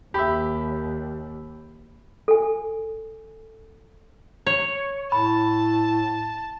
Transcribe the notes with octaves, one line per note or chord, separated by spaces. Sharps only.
D#2 G4 E5 B5
A4 G#5
C#5
A2 A5 B5